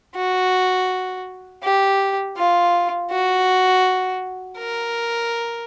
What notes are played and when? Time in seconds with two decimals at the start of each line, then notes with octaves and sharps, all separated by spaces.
0.16 F#4
1.64 G4
2.37 F4
3.11 F#4
4.58 A#4